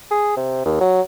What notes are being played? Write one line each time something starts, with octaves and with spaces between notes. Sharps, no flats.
G#4
C3
D#2
F#3